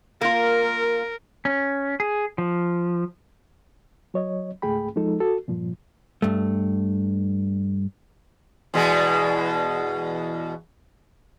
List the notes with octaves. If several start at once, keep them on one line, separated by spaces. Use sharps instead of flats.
A#3 F4 A#4
C#4
G#4
F3
F#3 C#5 D#5
C#2 G#2 A3 G#4 G5 B5
F3 G#3 D#4 A4
F#4 A4
G2 A#2 F3
G2 A3
E2 B2 G#3